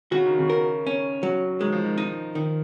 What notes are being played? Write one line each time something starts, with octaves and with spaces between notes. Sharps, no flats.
C#3 F#4
D#3
C#3
A#4
C#4
F#3
D#3 G#3
F3
D#3
D#4
D#3